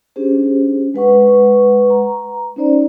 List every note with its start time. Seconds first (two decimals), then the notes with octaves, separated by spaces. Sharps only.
0.16 C#4 D4 G4 G#4 C5
0.94 G#3 B4 F#5 C#6
1.90 A#5
2.56 C#4 D#4 C5 D5